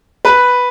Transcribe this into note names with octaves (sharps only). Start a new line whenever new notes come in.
B4